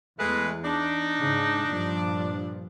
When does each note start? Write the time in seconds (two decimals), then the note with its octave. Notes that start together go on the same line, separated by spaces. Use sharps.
0.19 E2 G#3 A3 B4
0.64 D4 D#4
1.18 G#2 C#3
1.66 G2 A#2 F3